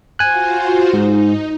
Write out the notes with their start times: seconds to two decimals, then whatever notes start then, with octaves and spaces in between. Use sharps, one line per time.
0.19 F4 F#4 C5 G#5 F#6
0.94 G#2 D#4